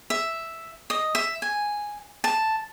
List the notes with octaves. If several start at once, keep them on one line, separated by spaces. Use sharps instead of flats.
E5
D#5
E5
G#5
A5